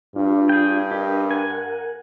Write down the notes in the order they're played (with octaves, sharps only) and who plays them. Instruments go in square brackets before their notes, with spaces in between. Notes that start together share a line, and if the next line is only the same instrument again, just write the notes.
[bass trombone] G2 [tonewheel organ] D4 F4
[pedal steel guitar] G#4 G5
[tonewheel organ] D4 A#4 D#5 [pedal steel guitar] G4
[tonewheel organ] A#4 F#5 [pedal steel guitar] G#5